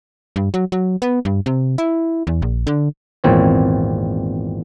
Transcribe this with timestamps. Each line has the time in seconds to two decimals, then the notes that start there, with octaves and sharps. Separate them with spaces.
0.36 G2
0.54 F#3
0.72 F#3
1.02 B3
1.25 G2
1.46 C3
1.78 E4
2.27 E2
2.42 A#1
2.67 D3
3.24 G#1 E2 A#2 C4 C#5